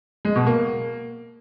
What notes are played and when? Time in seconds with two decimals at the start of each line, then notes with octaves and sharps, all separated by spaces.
0.25 G#3
0.36 B2
0.46 A#3